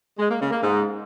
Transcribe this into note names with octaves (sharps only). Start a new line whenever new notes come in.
G#3
A#3
C#3
A#3
G#2